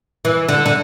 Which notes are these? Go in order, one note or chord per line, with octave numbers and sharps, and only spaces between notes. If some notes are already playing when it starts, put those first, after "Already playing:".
E3
D3
D3